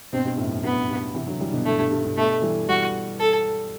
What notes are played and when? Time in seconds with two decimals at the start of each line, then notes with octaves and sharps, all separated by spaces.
0.13 G2 B2 C4
0.25 G2 B2
0.37 F#2 A2
0.51 F#2
0.63 G2 B3
0.89 G2
1.15 C3 E3
1.27 D3 F#3
1.40 E3 G3
1.52 B2 D3
1.65 G2 B2 A3
1.79 G2
1.91 G2
2.04 G2
2.16 G2 B2 A3
2.42 E3 G3
2.68 E3 G3 F#4
3.19 A4